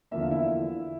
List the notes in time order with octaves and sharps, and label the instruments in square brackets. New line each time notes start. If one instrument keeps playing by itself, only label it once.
[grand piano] E2 D3 F3 A#3 E5
F5
E4 E5